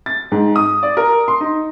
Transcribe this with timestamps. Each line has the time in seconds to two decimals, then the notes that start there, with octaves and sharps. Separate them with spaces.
0.06 A6
0.32 G#2
0.56 D#6
0.83 D5
0.97 A#4
1.28 C6
1.41 D#4